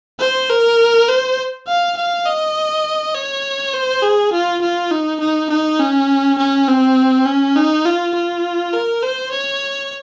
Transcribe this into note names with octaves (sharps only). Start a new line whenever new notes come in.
C5
A#4
C5
F5
F5
D#5
C#5
C5
G#4
F4
F4
D#4
D#4
D#4
C#4
C#4
C4
C#4
D#4
F4
F4
A#4
C5
C#5